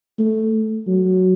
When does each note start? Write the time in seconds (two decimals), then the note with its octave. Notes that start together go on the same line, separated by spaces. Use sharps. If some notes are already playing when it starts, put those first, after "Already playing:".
0.19 A3
0.87 F#3